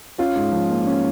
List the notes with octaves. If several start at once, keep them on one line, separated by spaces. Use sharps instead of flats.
C#4 F4
G#2
F3
A#3
C#4